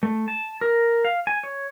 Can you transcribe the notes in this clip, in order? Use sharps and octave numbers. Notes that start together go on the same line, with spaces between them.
A3
A5
A#4
F5
G#5
C#5